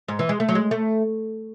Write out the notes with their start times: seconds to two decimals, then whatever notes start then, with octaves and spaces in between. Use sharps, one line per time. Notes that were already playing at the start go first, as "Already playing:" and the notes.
0.08 G#2
0.19 E3
0.29 G#3
0.40 A3
0.49 F#3
0.55 G#3
0.71 A3